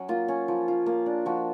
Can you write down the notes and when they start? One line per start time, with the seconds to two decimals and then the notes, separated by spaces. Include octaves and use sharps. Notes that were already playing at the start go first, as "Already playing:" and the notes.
Already playing: F#3 C#4
0.09 A#3 F4
0.28 C#4
0.48 F3
0.68 F4
0.86 A#3
1.06 D4
1.26 F3 F#4